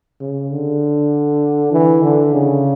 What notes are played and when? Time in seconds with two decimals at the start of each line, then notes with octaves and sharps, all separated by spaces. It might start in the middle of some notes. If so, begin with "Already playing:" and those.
0.21 C#3
0.52 D3
1.72 E3
2.02 D3
2.33 C#3